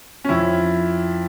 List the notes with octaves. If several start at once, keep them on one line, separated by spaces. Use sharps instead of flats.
C#4
F2 E4